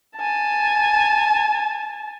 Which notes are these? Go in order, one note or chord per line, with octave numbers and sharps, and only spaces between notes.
G#5 A5